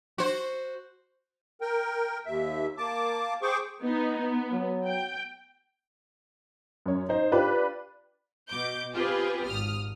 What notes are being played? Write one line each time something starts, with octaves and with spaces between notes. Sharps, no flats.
F#4 C5
A#4 G5
D#2 E5
A#3 A5 D6
G#4 C5 G5 C#6 D6
B3 D#4
B3
F#3
G5
F#2 C#5
D#4 C5
D4 F4 G4 B4
B2 D6 G6
C4 F4 G4 G#4 B4
G#1 D#6 F6